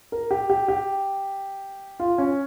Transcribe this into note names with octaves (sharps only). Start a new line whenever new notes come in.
A#4
G4
G4
G4
F4
C#4